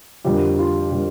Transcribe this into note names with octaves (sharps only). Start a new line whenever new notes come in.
F2 D3 G3 A#3 G4
F4
D3 G3 A#3 G4